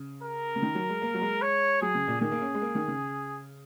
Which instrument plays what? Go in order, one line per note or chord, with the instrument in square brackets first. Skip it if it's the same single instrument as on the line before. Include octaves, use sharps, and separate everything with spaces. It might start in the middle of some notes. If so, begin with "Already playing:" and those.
Already playing: [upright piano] C#3
[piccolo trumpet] A#4
[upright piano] C#3
D#3
F#3
G#3
A#3
F#3
G#3
[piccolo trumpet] C#5
[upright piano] F#3 [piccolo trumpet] G#4
[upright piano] C#3
A#2
[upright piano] D#3 [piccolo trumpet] G#4
[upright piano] A#3
C#4
G#3
A#3
D#3
C#3